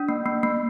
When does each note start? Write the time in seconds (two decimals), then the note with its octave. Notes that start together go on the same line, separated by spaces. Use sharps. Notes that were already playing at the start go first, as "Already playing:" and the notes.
Already playing: D4
0.09 A#3
0.26 A#3
0.43 A#3